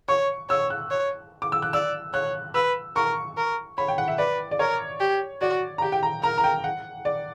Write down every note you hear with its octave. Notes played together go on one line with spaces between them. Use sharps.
C#5 C#6
C#5 E6
F#6
C#5
D6
E6
F#6
D5 E6
C#5 F#6
B4 E6
A#4 C#6
A#4
C#5 B5
G5
F#5
E5
B4 D5
D5
A#4 C#5
G4
F#4 D5
A#5
G4 G5
G5
A#5
A#4 A#5
A#5
G5
F#5
D5